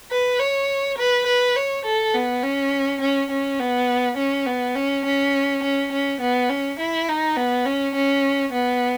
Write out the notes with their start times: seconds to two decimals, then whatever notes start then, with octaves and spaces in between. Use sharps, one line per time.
0.11 B4
0.40 C#5
0.98 B4
1.27 B4
1.56 C#5
1.85 A4
2.14 B3
2.43 C#4
3.01 C#4
3.30 C#4
3.59 B3
4.18 C#4
4.46 B3
4.75 C#4
5.05 C#4
5.63 C#4
5.92 C#4
6.21 B3
6.49 C#4
6.79 E4
7.08 D#4
7.37 B3
7.66 C#4
7.95 C#4
8.53 B3